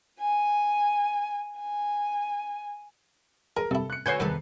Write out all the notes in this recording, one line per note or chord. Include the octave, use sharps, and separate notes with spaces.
G#5
G#5
G#4 A#4
G2 C3 E4 A4
F#6 C#7
D3 F#4 B4 C#5 G#5 C#6 G6 C7
E2 G2 C3 D#3 B3 A4